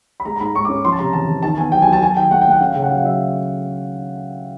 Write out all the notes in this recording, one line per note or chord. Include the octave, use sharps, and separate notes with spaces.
B5
G#3 A#5
A#5
G#2 B5
G#2 C#6
D6
C#4
F3 C6
A5
C3 A#5
E2 A5
E2
D#3 A5
B3 G#5
F#3 G5
G#5
F#3
A5
F#3 G#5
D#3 G5
A3 F#5
G5
A3 F#5
C#4 F5
C#3 G5
F#5
F#3 F5
F#3 E5